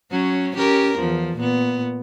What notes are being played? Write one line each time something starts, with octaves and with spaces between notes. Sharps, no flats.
F#3 C#4
C#4 G4 A#4
E2 F3
A#2 B3